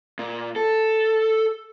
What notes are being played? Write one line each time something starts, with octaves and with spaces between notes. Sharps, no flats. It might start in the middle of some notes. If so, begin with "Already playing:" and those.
A#2
A4